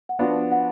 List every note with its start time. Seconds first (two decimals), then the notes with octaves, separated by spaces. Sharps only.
0.09 F#5
0.19 F3 B3 D4 F#4 F5
0.52 F#5